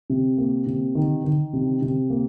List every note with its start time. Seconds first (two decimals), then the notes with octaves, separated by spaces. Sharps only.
0.10 C3
0.38 A#3
0.67 C3
0.95 D#3
1.24 D#3
1.53 C3
1.82 C3
2.10 A#3